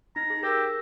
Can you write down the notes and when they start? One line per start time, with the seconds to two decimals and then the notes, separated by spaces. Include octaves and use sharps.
0.16 D#4 A#5
0.30 G#4
0.43 G4 A#4 E6 A#6